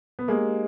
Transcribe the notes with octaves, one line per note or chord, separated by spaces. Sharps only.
B3
G#3 A#3 D4 G4 C5 D#5